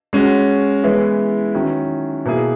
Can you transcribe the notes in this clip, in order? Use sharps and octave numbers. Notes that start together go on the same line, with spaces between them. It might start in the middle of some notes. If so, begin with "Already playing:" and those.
G#3 C#4 F#4
E3 G#3 B3 E4
D#3 F#3 C#4 E4
B2 A#3 E4 G#4